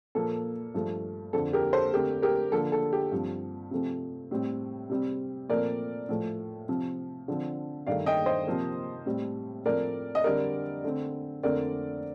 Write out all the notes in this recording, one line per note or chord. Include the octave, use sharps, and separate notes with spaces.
A#2 F3 A#3 A4
G2 F3 A3
F2 D3 F3 A4
G4 A#4
A4 C5
D3 A3 C4 G4 A#4
G4 A#4
D3 F3 A#3 A4
A4
G4
G2 F3 C4
C3 F3 A3 C4
A2 G3 C4
C3 G3 C4
A#2 F3 A3 C4 A#4 D5
A2 F3 A3
C3 F3 C4
D3 F3 C4
G2 D#3 A3 D5 F5
D#5 G5
C5 D#5
C3 F3 A#3
A2 G3 C4
A2 F3 A3 C4 A#4 D5
D#5
D3 G3 C4 A#4 D5
D3 A3 C4
F2 D3 A3 C4 A#4 D5